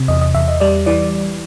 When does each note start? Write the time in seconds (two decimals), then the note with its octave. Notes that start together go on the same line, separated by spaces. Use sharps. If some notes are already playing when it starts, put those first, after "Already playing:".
Already playing: C3
0.08 E2 D#5
0.21 D#5
0.35 E2 E5
0.48 D#5
0.60 G3 D5
0.86 E3 D5